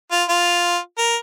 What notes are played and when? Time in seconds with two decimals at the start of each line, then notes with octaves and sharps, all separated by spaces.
0.11 F4
0.29 F4
0.98 A#4